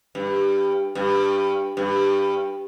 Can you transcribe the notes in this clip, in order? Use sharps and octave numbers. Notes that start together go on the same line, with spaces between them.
G2
G2
G2